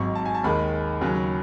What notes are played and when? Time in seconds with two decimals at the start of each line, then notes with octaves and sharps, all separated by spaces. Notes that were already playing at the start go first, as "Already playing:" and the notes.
Already playing: G#1 G#2 F#3 C#6
0.15 A5
0.26 G#5
0.35 A5
0.44 D#2 D#3 G#3 B5
1.01 D#2 C#3 F#3 C#4